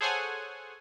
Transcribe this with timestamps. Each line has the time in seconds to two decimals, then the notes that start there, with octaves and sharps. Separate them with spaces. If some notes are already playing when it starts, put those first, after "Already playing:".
0.01 G#4 A4 C5 C#5 F#5 G#5